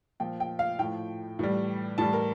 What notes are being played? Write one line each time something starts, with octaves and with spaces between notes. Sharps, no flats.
A#2 F3 G5
G5
F5
A2 F3 G5
A2 E3 G3
A2 E3 G3 A5
A#4